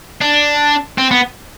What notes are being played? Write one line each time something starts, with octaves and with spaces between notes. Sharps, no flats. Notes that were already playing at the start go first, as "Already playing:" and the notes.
D4
C4
B3